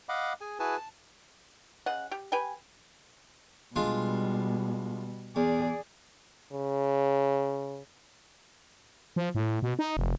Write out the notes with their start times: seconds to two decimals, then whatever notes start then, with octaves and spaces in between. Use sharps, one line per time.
0.09 D#5 F5 F#5 B5 D6
0.41 G#4 G#5
0.60 E4 F#4 G#4 B4 G#5 A5
0.77 A5
1.86 C#3 D#5 F#5
2.11 G4
2.32 G4 B4 G5 G#5
3.76 B2 G3 G#3 D4 F4
5.36 E2 G#4 D5
6.53 C#3
9.16 F3
9.35 A2
9.62 B2
9.79 D#4
9.97 F1